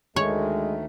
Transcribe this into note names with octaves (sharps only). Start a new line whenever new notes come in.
D2 D#3 G#3 A3 C#5